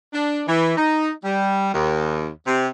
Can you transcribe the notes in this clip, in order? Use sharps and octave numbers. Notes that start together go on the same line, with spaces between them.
D4
E3
D#4
G3
D#2
C3